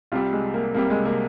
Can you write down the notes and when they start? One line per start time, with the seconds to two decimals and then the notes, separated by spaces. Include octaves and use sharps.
0.12 C2 C3 G3 F4
0.33 G#3
0.54 A#3
0.74 C2 C3 G3 A#3
0.90 G#3
1.05 A#3